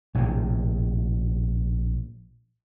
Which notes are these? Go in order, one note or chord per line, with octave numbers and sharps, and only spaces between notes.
A#1 A2 C3